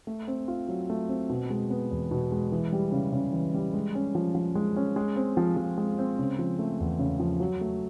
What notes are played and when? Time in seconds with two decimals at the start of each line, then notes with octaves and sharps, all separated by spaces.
0.07 A3
0.28 C4
0.48 F4
0.69 F#3
0.90 A3
1.09 C4
1.30 B2
1.50 G#3
1.70 B3
1.91 E2
2.11 B2
2.32 G#3
2.52 E3
2.72 G3
2.92 C#3
3.13 C#3
3.33 E3
3.54 G3
3.74 G#3
3.95 C#4
4.15 F3
4.35 F3
4.55 G#3
4.76 C#4
4.96 G#3
5.16 C4
5.37 F3
5.57 F3
5.78 G#3
5.99 C4
6.19 C#3
6.39 F3
6.59 A3
6.80 E2
6.99 C#3
7.20 F3
7.40 F#3
7.61 A3